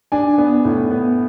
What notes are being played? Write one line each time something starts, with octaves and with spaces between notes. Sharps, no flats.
D4 G#5
B3
A2
B3